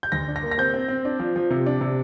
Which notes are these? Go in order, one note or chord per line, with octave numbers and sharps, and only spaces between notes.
G6
D2 A#6
D4
A#6
A#3
A#6
C4 G6
C4
C4
D4
F3
F3
C3
D4
C3